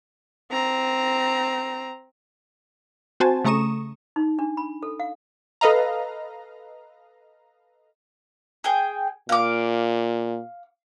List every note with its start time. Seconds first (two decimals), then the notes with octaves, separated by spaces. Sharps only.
0.52 C4 A#5
3.20 C4 F#4 C5 G#5 A5
3.44 C#3 A3 A#5 C#6 D#6 E7
4.16 D#4
4.39 D4
4.57 B5
4.83 A4
5.00 F5
5.61 A4 B4 D#5 F5 A#5
8.64 G#4 G5
9.29 A#2 F5 D6